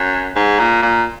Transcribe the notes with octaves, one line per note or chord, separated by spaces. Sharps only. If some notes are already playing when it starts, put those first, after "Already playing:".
Already playing: F#2
G#2
A#2
A#2